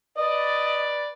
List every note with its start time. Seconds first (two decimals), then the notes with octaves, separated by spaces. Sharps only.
0.17 B4 D5 D#5